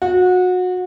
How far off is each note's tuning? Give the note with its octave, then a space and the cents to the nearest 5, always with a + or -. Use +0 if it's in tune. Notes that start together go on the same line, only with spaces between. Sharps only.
F#4 -25